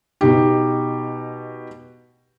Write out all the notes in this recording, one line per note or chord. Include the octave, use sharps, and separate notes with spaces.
B2 D#4 G4